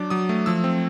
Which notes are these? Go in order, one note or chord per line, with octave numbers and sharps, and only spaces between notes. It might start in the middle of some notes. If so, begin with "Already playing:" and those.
Already playing: F#3 D4 D6
F#3 D#6
A3
F3 E6
C4